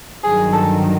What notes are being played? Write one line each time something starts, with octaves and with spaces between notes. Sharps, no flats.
G2 D#3 F#3 G#4
A4